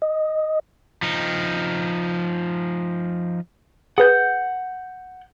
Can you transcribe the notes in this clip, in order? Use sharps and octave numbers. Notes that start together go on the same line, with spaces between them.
D#5
F3 D#4
G#4 B4 F#5 G6